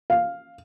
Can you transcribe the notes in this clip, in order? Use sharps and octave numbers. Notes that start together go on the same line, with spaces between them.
F5